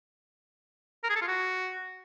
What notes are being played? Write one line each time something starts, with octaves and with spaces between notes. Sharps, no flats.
A#4
G#4
A4
F4
F#4